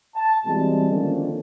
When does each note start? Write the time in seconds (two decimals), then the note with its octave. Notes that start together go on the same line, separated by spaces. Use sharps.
0.15 A5
0.46 B2 E3 G3 G#3 C4
0.90 D3 D#3 F3 A#3 C#4 D4